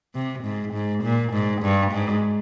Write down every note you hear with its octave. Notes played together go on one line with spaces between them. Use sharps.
C3
G#2
G#2
A#2
G#2
G2
G#2